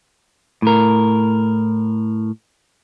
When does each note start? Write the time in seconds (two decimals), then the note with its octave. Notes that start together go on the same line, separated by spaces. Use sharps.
0.62 A2 A#4